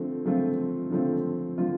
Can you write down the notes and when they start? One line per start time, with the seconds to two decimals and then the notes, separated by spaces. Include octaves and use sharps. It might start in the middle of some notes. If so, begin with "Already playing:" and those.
Already playing: D3 F3 A3 C4 F4
0.25 D3 F3 A3 C4 F4
0.90 D3 F3 A3 C4 F4
1.57 D3 F3 A3 C4 F4